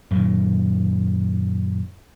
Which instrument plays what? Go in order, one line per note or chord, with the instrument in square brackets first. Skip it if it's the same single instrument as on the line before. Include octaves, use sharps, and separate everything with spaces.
[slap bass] F#2 A#2 D#3